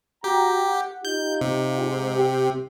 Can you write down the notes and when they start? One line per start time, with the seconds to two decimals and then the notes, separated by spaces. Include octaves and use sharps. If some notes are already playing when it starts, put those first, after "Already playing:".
0.24 F#4 G4 G5 A#5
0.67 F#5
1.05 D#4 F4 G4 G6
1.41 C3
1.80 G#2
2.16 G4